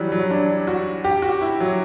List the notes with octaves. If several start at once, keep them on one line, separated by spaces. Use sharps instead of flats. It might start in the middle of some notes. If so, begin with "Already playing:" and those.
Already playing: E3 F#3 G3
F#3
D4
F#4
G4
F#4
E4
F#3